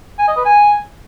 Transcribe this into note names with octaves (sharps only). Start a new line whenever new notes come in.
G#5
D#5
B4
G#5